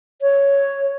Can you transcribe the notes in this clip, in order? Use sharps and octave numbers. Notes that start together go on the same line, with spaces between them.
C#5